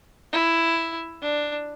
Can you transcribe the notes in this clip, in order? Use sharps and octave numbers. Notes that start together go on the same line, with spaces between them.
E4
D4